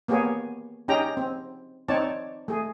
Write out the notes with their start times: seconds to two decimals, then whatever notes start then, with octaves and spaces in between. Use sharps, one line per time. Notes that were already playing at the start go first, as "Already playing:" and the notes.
0.08 A#3 B3 G4 G#4 C#5
0.88 C#4 D#4 G4 G#4 G5 A#5
1.17 C4
1.88 C4 D#4 C#5 D5 A5
2.48 A3 G#4